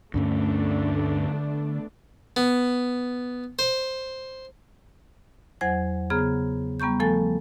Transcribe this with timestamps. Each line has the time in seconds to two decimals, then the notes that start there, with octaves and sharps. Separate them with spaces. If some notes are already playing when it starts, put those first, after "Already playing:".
0.14 D2 G2 D3 A3 B3 C#4 D4
2.36 B3
3.59 C5
5.61 E2 F#3 C5 F#5 G#5 G#6
6.10 C#3 B3 G#4 A#5 F6
6.80 G3 B3 A#5 C#6 G6
7.00 F3 A3 A4 G#5 A6